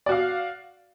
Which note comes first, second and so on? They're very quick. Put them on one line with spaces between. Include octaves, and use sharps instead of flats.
D5 F#4 F5